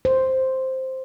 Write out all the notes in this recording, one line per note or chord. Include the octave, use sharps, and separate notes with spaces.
C5